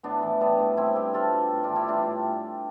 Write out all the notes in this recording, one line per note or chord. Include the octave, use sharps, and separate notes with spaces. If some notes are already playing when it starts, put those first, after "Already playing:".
A2 B3 D4
E3
G3 B3 D4
A2
G3 C4 E4
G3 G4 B4
B2 F4 A4
B2
A2
D4 F4
E3
E4 G4
G3 D4 F4
A2